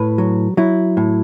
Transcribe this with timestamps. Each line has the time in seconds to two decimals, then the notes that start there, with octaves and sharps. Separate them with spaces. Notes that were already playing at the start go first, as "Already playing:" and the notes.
Already playing: A2 B4
0.18 F#3
0.57 F#3 E4
0.97 A2